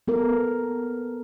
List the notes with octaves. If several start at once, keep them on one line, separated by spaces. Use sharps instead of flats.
B3 A4 A#4